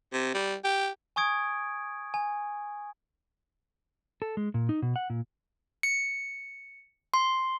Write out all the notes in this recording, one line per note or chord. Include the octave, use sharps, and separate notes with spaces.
C3
G3
G4
G#5 C#6 D#6 G#6 D7
G#5
A4
G#3
A#2
D#4
B2
F#5
A#2
C#7
C6